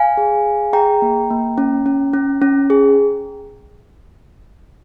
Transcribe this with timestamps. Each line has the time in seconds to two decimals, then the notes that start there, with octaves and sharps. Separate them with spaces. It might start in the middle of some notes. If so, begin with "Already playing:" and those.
Already playing: F5 G#5
0.17 G#4
0.46 G#4
0.73 G#4 G5 A#5
1.02 A#3
1.30 A#3
1.58 C#4
1.86 C#4
2.14 C#4
2.42 C#4
2.70 G#4